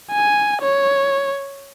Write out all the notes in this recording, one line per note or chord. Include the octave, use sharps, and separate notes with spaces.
G#5
C#5